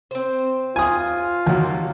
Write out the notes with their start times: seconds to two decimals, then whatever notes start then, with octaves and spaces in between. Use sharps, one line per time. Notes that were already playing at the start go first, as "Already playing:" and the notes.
0.11 C4 C5
0.76 F4 G#5 D#6
1.47 D#2 C3 F#3 G3 A#3